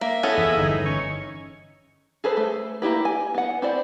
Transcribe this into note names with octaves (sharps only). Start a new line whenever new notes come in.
A#3 E5
B3 C#4 E4 G#4 A4 D#5
E2 F3
G1 E3 D#4
C#4 C#5 G#5
G#4 A4 B4 C5
A3
A#3 E4 G4 B4
G#5
B3 F#5
C4 E4 C5 D5